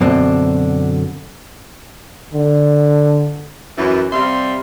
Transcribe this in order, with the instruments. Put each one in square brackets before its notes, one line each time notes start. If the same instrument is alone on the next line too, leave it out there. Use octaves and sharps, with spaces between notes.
[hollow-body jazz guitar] F#2 B2 D3 C4 D4
[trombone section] D3
[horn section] F#2 E3
C3 G3 E5 F5 C6